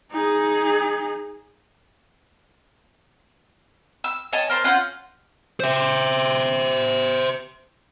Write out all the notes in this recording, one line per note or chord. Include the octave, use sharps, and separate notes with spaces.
D#4 G#4
E6
C#5 D#5 G#5 A5
A#4 C5 A5
C#4 F4 F#5 G6
C5 E5